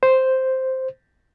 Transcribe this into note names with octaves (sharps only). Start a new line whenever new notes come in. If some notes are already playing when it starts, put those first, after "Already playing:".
C5